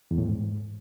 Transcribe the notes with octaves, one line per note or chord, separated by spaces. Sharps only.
E2
A2
G#2